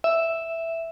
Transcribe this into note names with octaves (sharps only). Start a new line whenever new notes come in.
E5